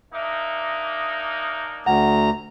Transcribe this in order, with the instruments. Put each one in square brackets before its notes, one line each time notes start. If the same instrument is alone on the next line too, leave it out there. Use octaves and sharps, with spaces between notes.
[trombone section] A#3 D4 D#4 [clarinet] E5
[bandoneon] D2 A#5 [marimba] F#5